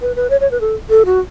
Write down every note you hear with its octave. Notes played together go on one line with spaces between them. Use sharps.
B4
B4
C#5
C#5
B4
A4
A4
F#4